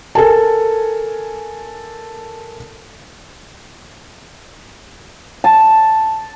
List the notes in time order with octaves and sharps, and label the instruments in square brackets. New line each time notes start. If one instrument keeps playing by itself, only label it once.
[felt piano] A4 A#4 G#5 A5
[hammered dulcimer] A5